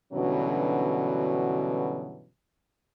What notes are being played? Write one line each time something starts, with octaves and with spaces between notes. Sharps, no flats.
G2 B2 D3 E3 F#3 C#4